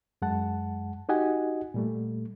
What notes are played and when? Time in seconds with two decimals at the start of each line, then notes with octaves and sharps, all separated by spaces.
0.22 F#2 G#3 F#5 A5
1.09 D#4 F#4 G4 D#5 F#5 G#5
1.74 A#2 G3 A3